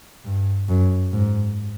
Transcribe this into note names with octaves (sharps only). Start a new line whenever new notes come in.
G2
F#2
G#2